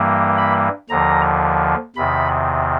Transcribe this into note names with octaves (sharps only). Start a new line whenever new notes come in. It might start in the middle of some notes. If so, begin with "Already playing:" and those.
Already playing: G2 E3 G3 A#3
B5
D#2 D3 F3 A#5
E2 C3 D#3 B5